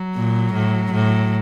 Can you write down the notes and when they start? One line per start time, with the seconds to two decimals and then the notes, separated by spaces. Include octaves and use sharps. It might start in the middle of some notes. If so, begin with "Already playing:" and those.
Already playing: F#3
0.16 A#2
0.53 A2
0.93 A2